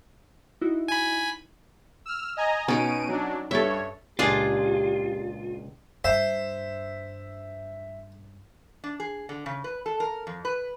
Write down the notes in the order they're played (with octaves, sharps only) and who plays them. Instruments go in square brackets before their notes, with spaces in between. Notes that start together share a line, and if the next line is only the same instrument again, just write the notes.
[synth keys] D#4 E4 F#4
[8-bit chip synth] G#5 B5
[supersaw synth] E6 F6
D#5 G#5 A#5
[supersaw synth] B2 D7 D#7 [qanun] C#4 D#4
[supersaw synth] F#3 D4
[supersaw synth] G2 C#5 [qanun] A4 E5
[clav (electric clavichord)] C#2 A#2 [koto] D4 G#4 [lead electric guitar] F4 [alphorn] G4
[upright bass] G2 [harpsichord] C5 [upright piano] E5
[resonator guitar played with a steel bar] D4
G#4
D3
C#3
B4
A4
A#4
F2
B4